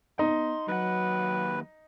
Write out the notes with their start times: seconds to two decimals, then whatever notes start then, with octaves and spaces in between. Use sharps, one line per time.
0.19 B3 D#4 C6
0.68 D#2 F#3 B4 F#5